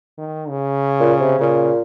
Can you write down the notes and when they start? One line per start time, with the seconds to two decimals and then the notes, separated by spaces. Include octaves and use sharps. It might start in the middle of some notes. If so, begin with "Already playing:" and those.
0.18 D#3
0.49 C#3
1.00 A#2
1.20 C3
1.39 A#2 C#3